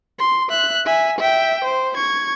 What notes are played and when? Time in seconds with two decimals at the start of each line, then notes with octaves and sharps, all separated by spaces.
0.19 C6
0.49 E5 F#6
0.86 E5 G#5
1.18 E5 G5
1.64 C5
1.96 C#6 G#6